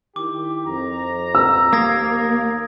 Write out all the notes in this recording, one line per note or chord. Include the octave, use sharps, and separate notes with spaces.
D#3 E4 G4 D6
F2 A#5
E6
D#2 A#3 A#5 D#6 G#6 A#6